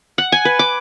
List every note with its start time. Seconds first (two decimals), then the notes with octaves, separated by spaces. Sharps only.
0.18 F#5
0.32 G#5
0.45 B4
0.59 D6